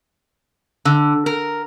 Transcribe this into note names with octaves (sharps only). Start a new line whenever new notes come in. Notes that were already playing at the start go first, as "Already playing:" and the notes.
D3
A#4